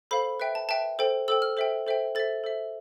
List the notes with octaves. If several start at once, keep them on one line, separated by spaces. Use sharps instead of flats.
A4 C5 F5 B5
B4 E5 G5
A5
B4 E5 G5 A5
A4 C5 G5
A4 C5 G5 E6
F6
A4 C5 E5 G5
A4 C5 E5 G5
A4 C5 E5 A6
A4 C5 E5